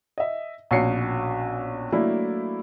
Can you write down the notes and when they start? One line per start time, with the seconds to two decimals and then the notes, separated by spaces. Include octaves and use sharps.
0.18 D#5 E5
0.71 A#1 B2 C#4 C7 C#7
1.92 F#3 A3 A#3 D4 E4